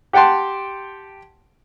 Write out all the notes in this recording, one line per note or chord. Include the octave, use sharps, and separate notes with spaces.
G4 F#5 G5 A5 C6